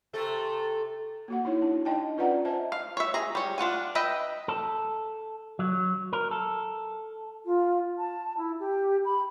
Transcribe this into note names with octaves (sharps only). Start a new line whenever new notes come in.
C3 A3 A4
A#3 F#4 F#5
D#4 E4 C#5
D4
D#4 D#5 G5 A5
C#4 F4 B4 D5 F#5 A#5
C5 D#5 E5 G#5 A5
F5
C#5 E5
G#4 A#5
G3 C#5
D4 F4 F#5 G#5
B4 D#5 E5 G5
A4
F#3
A#4
A4
F4
A5
E4
G4
B5